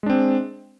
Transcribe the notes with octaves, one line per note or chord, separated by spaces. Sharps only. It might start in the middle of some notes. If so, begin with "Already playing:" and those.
G#3 C4 D4